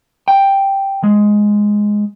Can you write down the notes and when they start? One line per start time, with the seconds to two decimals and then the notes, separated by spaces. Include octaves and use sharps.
0.28 G5
1.03 G#3